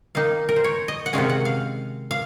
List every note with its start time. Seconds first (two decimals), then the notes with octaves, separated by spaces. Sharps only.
0.15 D#3 A#3 D#4 F5
0.49 A#4
0.56 C5
0.64 C#5
0.88 D#5
1.06 F#5
1.13 C3 D#3 G#3 C#4 F5
1.30 F#5
1.45 F5
2.11 F5